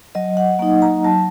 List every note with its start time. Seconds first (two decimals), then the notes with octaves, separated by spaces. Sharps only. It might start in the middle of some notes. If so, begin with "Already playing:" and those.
0.15 F#3 D#5
0.37 F#5
0.59 A#3 D#4
0.82 A#5
1.04 F#3 A5